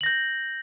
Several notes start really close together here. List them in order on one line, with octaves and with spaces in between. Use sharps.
F#7 A#6 G6